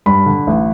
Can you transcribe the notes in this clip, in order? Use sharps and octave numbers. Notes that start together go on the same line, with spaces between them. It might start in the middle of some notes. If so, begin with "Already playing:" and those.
G2 B5
D3
A1